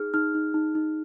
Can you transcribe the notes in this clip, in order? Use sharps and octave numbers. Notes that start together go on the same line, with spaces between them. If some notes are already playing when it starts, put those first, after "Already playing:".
Already playing: D#4 G#4 F6
D#4 F6
D#4
D#4
D#4